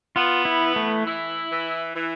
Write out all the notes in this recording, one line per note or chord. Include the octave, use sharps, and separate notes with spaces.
B3 F4
E4
E3
A3
E4
E3
E3